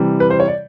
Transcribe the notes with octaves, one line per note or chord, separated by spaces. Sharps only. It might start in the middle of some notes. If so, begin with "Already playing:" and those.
Already playing: C3 E3 G3
B4
C5
C#5
D5